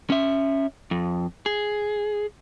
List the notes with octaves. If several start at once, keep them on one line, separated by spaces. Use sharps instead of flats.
C#4 E5
F2
G#4